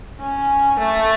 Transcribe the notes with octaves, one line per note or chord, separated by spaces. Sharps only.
C#4
A3